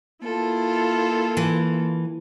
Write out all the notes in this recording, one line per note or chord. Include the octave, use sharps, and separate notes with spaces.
A#3 E4 F4 A4
E3